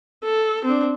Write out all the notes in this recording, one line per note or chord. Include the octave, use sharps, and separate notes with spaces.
A4
C4 D4